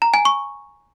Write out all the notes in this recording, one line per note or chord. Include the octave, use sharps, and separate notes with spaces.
A#5
G#5
C#6